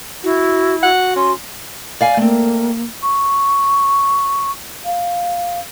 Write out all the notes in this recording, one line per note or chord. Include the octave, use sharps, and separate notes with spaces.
E4 F#4
F#4 F#5
C#4 C6
D5 F5 G#5
A3 A#3 C4
C#6
F5